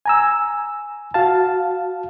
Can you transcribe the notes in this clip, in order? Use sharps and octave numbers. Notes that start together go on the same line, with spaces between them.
G#5 A#5 E6
F#4 F5 A5